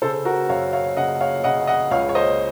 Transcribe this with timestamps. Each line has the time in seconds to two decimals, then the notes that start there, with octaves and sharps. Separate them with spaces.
0.02 C#3 A4 C5
0.25 F#4 A#4
0.49 F#2 C#5 F5
0.73 C#5 F5
0.97 C#3 D#5 F#5
1.21 C#5 F5
1.44 C#3 D#5 F#5
1.67 D#5 F#5
1.91 C#2 C#5 F5
2.09 C#5
2.15 C5 D#5